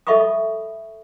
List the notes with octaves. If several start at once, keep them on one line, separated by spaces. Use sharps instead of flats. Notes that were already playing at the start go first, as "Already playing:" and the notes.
A4 D#5 E5 B5 C#6 D#6